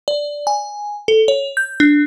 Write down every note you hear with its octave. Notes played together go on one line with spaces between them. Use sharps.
D5
G#5
A4
C#5
G6
D4